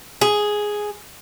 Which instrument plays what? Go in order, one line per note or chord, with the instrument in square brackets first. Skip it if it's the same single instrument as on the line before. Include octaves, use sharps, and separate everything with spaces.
[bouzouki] G#4